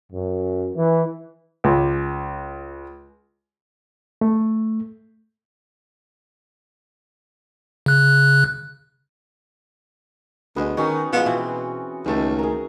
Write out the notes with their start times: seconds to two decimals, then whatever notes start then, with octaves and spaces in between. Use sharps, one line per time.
0.12 F#2
0.74 E3
1.64 C#2
4.21 A3
7.86 C#3 F#6
10.56 D2 G#3 B3
10.77 D#3 C#4 D#4 F#4
11.13 F3 G#3 B3
11.26 B2 E3 C4
12.06 C#2 D#3 A3 D#4
12.39 G#4 A#4